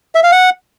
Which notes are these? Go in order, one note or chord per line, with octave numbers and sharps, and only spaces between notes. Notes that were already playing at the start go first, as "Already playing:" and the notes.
E5
F5
F#5